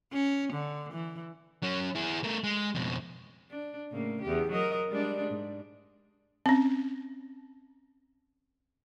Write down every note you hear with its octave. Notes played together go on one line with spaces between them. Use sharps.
C#4
D3
E3
F#3 C#4
E4 G#4
A3 A#4
G#3
F2 B2
D4
A2 C#3 A#3
E2 G4
F#3 A#4 D#5
G3 G#3 D4
G#2
C4 C#4